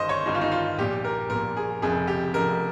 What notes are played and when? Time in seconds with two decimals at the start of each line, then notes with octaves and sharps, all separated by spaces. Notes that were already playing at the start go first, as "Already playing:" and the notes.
Already playing: G1 G2 D#3 C5 D#5
0.09 C#5
0.26 G1 G2 D#3 D#4
0.35 F4
0.41 D#4
0.52 F4
0.78 A#1 A#2 G4
1.05 A#4
1.30 A#1 A#2 A#4
1.57 G#4
1.82 F1 F2 C#3 G#4
2.08 G4
2.33 F1 F2 C#3 A#4